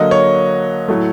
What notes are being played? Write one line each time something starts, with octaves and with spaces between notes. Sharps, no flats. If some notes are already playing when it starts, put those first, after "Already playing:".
Already playing: D3 F#3 A#3 D#5
C#5
A2 F#3 A3